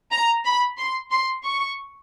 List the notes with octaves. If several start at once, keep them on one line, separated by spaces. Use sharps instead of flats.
A#5
B5
C6
C6
C#6